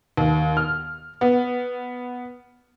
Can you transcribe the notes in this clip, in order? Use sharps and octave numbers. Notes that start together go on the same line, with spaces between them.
D#2
F6
B3